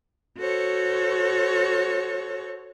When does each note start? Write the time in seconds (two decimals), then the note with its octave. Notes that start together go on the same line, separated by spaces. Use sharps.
0.37 F#4 A4 C5 C#5